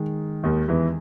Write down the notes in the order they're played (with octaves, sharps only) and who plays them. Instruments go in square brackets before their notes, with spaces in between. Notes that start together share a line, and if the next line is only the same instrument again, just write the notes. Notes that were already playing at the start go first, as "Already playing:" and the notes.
Already playing: [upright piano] D#3 G#3
[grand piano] D#2 D#3
E2 E3